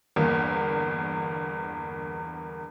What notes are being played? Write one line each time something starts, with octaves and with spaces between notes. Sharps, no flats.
G1 E2 A#3